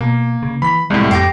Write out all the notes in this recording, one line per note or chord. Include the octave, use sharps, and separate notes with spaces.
B2 A#3
C#3
E3 B5 B6
C2 A2 G#3
F2 G4 D6 A#6 C7